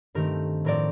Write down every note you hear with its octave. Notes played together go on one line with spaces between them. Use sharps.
G2 D#3 A3 C4 G4 A#4
A2 F3 C4 A#4 D5